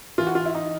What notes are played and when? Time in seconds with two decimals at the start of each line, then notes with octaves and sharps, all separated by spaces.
0.18 E3 F4
0.27 F#4
0.35 F4
0.46 E4
0.55 D#4